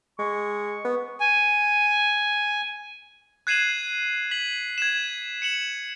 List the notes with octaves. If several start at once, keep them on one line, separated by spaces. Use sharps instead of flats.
G#3 C#6
B3
G#5
F#6 G#6 C7 D#7 E7 F#7
B6 F#7
G#6 E7
C#7 E7 F#7